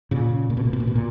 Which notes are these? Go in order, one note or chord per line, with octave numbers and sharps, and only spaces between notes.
A#2 C#3
A#2
B2
A#2
B2
A#2
B2
A#2